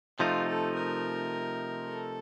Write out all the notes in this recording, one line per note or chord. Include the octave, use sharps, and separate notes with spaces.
C3 F3 A3 D#4 F4
A4
A#4
A4